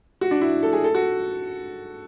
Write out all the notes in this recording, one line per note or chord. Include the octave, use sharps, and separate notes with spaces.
F#4
D4
E4
A4
G#4
A4
F#4